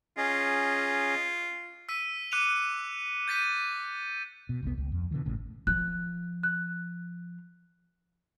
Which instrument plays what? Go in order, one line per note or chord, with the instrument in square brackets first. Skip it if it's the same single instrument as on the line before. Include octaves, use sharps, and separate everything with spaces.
[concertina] C#4 G#4 D#5 [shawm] F4
[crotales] E6 B6 D#7
D6 F#6 C#7 D#7 F7
G6 A6 B6 D#7
[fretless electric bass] B2
F1 C2 B2 B3
C#2
F2
B2 D3 E3 F3
G#1 A2 C#3
[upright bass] F3 [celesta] F#6
[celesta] F#6